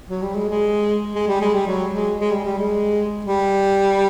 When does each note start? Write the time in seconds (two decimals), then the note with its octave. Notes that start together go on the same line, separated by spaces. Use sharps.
0.10 F#3
0.22 G3
0.35 G#3
0.49 G#3
1.15 G#3
1.28 G3
1.41 G#3
1.54 G3
1.67 F#3
1.93 G#3
2.20 G#3
2.32 G3
2.45 G3
2.58 G#3
3.25 G3